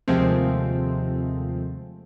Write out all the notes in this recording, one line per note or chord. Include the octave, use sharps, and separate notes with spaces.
D#2 C3 F3 G#3 A3 C4